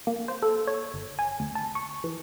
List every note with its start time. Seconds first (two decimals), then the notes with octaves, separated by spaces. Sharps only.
0.07 A#3
0.28 C5
0.42 A4
0.67 C#5
0.94 G1
1.19 G#5
1.40 D2
1.55 A5
1.75 C#6
2.04 E3